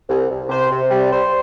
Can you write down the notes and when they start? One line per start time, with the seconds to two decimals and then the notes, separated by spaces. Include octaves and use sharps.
0.09 C2
0.30 C2
0.50 C3 C5
0.70 C3
0.91 G3
1.12 G3 C5